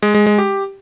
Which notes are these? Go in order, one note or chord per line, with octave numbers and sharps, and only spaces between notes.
G#3
G#3
G#3
G4